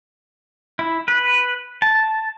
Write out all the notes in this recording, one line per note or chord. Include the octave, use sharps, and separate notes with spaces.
E4
B4
A5